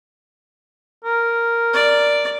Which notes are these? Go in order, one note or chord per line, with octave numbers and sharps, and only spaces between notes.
A#4
D5